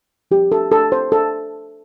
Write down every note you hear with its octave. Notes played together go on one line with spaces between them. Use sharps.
F3 C4 G4
A4
A4
C5
A4